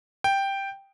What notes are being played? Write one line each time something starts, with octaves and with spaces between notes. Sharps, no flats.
G5